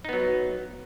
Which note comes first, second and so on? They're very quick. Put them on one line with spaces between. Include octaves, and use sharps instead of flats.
D#4 B3 F#3